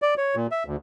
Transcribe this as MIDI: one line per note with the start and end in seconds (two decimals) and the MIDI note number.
0.02 0.14 74
0.17 0.35 73
0.35 0.47 46
0.51 0.64 76
0.66 0.76 38